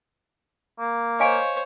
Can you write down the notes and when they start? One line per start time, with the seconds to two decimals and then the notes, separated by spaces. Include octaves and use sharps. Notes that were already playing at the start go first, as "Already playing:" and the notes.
0.79 A#3
1.20 C5 C#5 D#5 F5 G#5